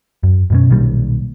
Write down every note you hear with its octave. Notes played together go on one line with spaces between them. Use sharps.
F#2
F#2 B2 C#4
B1 A#2 D#3 G3